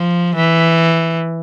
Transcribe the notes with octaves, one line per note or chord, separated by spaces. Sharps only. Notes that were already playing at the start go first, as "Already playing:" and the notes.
Already playing: F3
E3